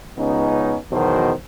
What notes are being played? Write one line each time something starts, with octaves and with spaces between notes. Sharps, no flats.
C#2 B3 C#4 D#4
E2 B2 D#3 F#3 C5